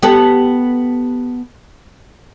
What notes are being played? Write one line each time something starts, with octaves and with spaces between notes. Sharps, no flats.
B3 G4 A4